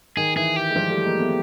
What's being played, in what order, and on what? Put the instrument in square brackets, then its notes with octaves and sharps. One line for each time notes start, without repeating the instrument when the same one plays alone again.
[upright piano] D#3 [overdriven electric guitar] G#4
[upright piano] E3 [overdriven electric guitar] G#4
[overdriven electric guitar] G4
[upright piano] G#3
F3 G3
G3 A3
G#3 A#3
A3 B3